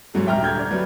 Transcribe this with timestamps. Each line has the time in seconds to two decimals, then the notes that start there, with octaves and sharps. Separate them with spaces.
0.14 G#2 F#3 A3
0.26 D#1 E5 G5 A#5 F6
0.42 D3 G6 G#6
0.59 D5
0.71 F#3 G3 B4